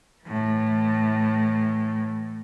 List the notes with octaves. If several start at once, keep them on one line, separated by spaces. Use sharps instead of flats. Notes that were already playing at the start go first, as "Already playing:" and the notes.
A2 E3